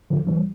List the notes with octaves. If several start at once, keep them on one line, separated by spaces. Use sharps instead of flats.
D3 F3
E3 G3